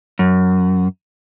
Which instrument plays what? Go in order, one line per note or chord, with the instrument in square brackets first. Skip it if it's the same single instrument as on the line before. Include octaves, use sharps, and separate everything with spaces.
[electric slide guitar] F#2